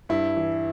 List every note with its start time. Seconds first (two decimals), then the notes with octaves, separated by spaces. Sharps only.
0.09 G2 E4
0.37 E3